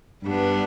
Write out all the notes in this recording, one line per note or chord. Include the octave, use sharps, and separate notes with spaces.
G2 G3 B3 D4